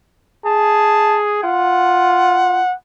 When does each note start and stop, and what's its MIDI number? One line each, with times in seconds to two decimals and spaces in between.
0.45 1.42 68
0.45 1.19 81
1.44 2.61 65
1.44 2.74 78